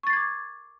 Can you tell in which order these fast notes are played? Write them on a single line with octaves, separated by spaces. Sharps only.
C#6 A6 C7 G#6 D6